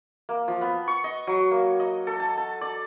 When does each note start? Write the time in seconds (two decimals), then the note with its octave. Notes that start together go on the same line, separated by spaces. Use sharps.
0.29 A#3
0.48 F3
0.61 B3
0.88 C#6
1.04 D#5
1.27 F#3
1.51 A#3
1.80 D#5
2.07 A4
2.20 A5
2.38 A5
2.61 D5